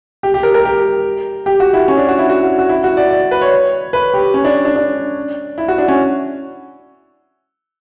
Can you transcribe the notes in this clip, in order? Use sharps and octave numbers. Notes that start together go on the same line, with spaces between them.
G4
G4
A#4
A#4
G4
G4
F#4
E4
C#4
D4
F#4
E4
F#4
F#4
E4
F#4
D5
D5
B4
C#5
B4
G4
C#4
D4
D4
D4
E4
F#4
D4
C#4